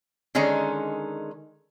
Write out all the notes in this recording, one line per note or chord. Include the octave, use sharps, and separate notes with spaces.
D3 D#3 G#3 C#4 D#4